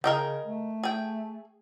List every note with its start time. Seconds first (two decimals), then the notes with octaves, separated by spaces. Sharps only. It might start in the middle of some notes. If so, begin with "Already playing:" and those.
0.04 C#3 A#4 D#5 G5
0.46 A3
0.83 G#4 G5